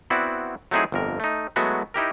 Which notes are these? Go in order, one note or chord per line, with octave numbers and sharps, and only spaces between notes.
B3 C4 E4 F#4 D5
F#3 A3 C4 D#4 E4 G#4
G1 F2 A#4
A3 D#4
F#3 G#3 A3 B3 E4 F#4
D#4 E4 G4 A#4